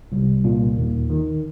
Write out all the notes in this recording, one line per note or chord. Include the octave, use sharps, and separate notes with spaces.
C2
A#2
D#2
D#3